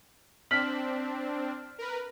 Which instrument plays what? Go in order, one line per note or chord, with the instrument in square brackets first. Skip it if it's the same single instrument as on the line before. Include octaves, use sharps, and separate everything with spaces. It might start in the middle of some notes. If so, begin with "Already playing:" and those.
[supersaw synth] C4 D4 [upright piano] F6 B6 F#7
[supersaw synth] A#4 B4